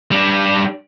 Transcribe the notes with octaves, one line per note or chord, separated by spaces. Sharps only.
G3 D4